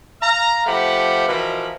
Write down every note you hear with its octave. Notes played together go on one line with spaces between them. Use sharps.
F5 A#5
F3 A3 G4 F#5 B5
B2 E3 F3 A#4 B5